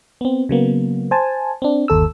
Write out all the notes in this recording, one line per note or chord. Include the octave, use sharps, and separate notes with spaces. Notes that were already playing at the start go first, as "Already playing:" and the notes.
B3 C4
C#3 F#3 A#3 B3
C5 G#5 A5
C4 D4
G1 D#2 A4 E6